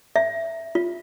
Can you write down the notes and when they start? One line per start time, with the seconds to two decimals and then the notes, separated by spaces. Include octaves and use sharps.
0.16 E5
0.75 F4